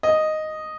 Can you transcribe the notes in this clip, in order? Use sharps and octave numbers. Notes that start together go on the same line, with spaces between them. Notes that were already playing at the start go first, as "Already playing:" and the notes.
D#5